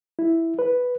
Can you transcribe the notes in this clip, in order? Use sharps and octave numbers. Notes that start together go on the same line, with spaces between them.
E4
B4